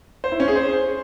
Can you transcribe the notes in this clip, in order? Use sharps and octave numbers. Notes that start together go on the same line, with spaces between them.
C5
E4
C#4
G#4
C5